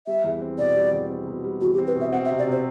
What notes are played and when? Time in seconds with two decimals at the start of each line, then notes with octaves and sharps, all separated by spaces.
0.07 G3 E5
0.24 E2
0.41 C4
0.58 B2 D5
0.76 G3
0.93 E2
1.10 C4
1.27 B2
1.44 G3
1.61 E2 F#4
1.74 G4
1.78 C4
1.87 B4
1.96 B2 E5
2.12 C4 F#5
2.25 E5
2.31 C3
2.39 D5
2.47 C3 C5